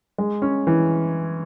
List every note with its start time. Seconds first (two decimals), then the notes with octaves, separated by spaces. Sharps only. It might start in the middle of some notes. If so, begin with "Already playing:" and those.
0.18 G#3
0.42 C#4
0.67 E3